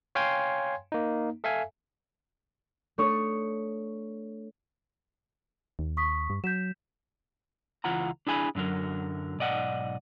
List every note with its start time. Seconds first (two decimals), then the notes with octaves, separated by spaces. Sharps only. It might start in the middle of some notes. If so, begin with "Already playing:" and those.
0.15 C#5 F5 G5 G#5 C6 G#6
0.92 A#3 D#4
1.44 A4 E5 F5 G#5
2.98 A3 D4 C#5 C#6 D#6
5.79 D#2
5.97 C#6 D#6 B6
6.30 G2
6.44 F#3 G6 B6 E7
7.84 C#2 E3 F4 F#5 A#5
8.27 D4 E4 G#4 G#5 A5 B5
8.55 F#2 D3 F#3 A#4
9.39 B1 G#2 D5 D#5 F#5